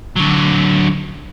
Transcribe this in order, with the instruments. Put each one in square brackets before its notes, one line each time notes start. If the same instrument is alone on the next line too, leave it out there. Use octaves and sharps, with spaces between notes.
[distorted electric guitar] D3 F#3